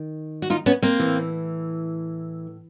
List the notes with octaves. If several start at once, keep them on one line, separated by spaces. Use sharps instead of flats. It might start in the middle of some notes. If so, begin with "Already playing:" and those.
Already playing: D#3
F#4
D#4 F4
B3 C#4
A#3 C4
A2 E3